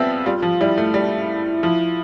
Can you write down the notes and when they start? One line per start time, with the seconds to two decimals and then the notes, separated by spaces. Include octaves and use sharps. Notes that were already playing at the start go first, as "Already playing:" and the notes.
Already playing: F3 G3 B3 C4 E5
0.26 G3 F4
0.42 F3
0.61 G3 E4
0.78 A3
0.94 G3
1.63 F3